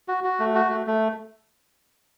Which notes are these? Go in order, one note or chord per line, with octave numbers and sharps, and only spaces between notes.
F#4
F#4
A3
F#4
A3
A3